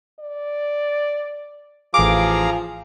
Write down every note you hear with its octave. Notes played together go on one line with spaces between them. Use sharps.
D5
A1 F3 G#4 F5 A#5 D6